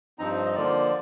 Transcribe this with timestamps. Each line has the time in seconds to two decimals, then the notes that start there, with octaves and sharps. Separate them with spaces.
0.19 G2 F3 C4 D#4 A#5
0.46 D#5
0.55 D3 F3 A#3 F4 D5